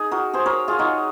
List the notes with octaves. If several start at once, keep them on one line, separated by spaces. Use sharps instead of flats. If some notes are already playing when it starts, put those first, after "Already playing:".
Already playing: D#4 G#4
F#4 A#4
G#4 C5
A#4 C#5
F4 G#4
D#4 F#4